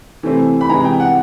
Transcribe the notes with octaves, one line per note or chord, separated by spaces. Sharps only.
C3 E3 A3 C4
B5
C3 E3 G#3 A#5
G5
F#5